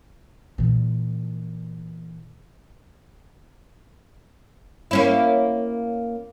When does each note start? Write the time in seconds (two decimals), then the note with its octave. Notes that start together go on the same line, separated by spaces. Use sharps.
0.58 A#2 E3
4.91 A#3 C#4 E4